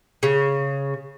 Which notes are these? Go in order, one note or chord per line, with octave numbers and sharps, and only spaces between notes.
C#3